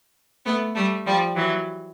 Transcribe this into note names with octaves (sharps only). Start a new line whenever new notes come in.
A3 B3
G3 A3
F3 G3
E3 F#3